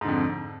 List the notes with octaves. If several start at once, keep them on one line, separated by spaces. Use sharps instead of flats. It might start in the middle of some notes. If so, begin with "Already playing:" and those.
F2 G#2 D3